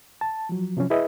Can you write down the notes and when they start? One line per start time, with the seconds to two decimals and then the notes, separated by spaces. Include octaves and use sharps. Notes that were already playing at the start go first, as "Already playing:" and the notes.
0.21 A5
0.49 F3 F#3
0.77 C3 F3 F#3 C#4
0.90 E4 G#4 B4 D#5 E5